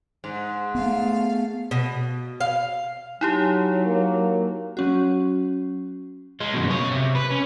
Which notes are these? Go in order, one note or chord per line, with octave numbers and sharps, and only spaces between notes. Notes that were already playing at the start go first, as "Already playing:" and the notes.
G#2
A3 B3 F5
B2
F5
F#3 D#4 E4 G4
A#3
F#3 C#4 F#4
G#3 F4
F#2 B2
C#3 C#5
C3
B4
C#4